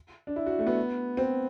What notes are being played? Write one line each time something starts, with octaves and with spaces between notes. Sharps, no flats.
D4
E4
F#4
A3
B3
C4